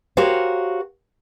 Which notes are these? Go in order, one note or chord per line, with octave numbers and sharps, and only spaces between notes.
F#4 G4 A#4 C5 C#5 F5